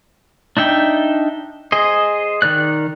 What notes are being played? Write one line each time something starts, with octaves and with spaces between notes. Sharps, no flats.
D4 D#4 E5 G5
G#4 C5 D#5
D#3 A#4 D5 F#6